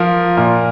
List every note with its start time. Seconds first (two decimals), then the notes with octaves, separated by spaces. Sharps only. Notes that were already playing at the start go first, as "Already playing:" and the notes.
Already playing: F3 A#4
0.37 A#2